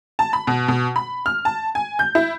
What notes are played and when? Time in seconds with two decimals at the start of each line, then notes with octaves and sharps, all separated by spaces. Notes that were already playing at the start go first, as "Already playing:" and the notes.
0.19 A5
0.33 B5
0.47 B2
0.68 B2
0.96 B5
1.26 F6
1.45 A5
1.75 G#5
1.99 G6
2.15 E4